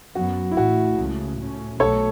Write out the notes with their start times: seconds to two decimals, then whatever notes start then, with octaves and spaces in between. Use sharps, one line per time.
0.15 F#2 F#3 B3 F#4
0.51 E4
0.56 A1 A2 A3 F#4
0.97 C#2 C#3 E3 A3
1.39 A2 A3 C#4
1.79 B1 B2 F#3 A3 A4 C#5